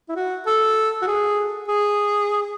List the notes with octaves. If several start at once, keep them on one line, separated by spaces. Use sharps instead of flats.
E4
F#4
A4
F#4
G#4
G#4